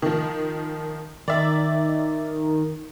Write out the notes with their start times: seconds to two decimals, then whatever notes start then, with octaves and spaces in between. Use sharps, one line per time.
0.02 D#3 F3
1.28 D#3 D5 E5